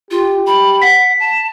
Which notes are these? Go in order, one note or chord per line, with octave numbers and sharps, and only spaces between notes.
F4 G4
B5
F#5 B6
A5